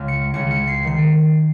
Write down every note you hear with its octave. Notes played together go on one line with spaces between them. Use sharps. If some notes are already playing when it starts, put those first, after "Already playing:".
Already playing: C#2 C#3 F6
C#7
C#2 C#3 C#7
C#7
C7
D#3 C7